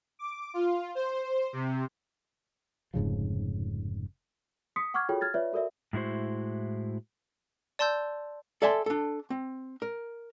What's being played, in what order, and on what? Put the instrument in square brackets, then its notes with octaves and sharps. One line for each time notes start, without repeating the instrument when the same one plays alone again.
[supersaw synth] D6
F4
C5
C3
[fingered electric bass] F1 G#2 C#3 F3
[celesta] C6 D#6 B6 C#7
F#5 C#6 D6 F6 G#6
F4 F#4 G#4 A4 C#5 G5
F6 G#6 A6
F4 B4 C#5 D5 E5
F#4 A4 A#4 D5 E5
[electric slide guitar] A2 G#3 E4 F#4 C5
[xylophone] D5 A5 C6 E6 G6
[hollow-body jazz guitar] A4 D5 E5 G#5 A5 C6
D4 A4
C4
A#4